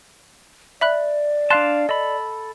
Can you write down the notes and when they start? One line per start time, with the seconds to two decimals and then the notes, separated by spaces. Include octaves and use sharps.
0.81 D5 E5 B5 F#6
1.50 D4 F5 A5 C6 F#6
1.89 A4 D#5 B5